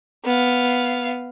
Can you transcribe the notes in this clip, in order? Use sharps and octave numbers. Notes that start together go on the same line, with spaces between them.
B3 F5